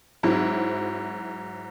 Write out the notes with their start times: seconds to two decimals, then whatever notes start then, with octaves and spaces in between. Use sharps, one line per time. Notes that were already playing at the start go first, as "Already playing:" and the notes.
0.23 G#2 F#3 C4 E4